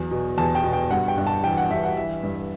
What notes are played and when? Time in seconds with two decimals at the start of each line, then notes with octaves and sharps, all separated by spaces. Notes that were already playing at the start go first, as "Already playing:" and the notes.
Already playing: E2 F#3
0.11 B2
0.38 E2 A5
0.55 G5
0.64 B2
0.73 G5
0.90 G2 F#5
1.08 G5
1.18 G2
1.27 A5
1.43 E3 G5
1.57 F#5
1.70 G2 E5
1.84 F#5
1.97 E3 E5
2.23 G2